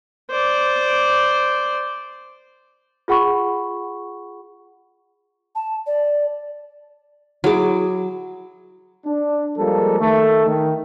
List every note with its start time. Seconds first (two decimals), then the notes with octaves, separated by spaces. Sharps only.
0.31 C5 D5
3.08 F4 G#4 F#5 B5 C#6
5.55 A5
5.87 D5
7.44 F#3 E4 G#4 D6
9.06 D4
9.58 F3 G3 G#3 A#3 A4
10.00 D#3 A3
10.47 D#3